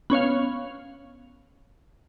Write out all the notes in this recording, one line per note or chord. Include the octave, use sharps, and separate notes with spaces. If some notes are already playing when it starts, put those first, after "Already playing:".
B3 C#4 C#5 F5